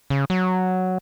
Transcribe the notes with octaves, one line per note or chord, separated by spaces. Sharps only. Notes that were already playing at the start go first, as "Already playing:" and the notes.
C#3
F#3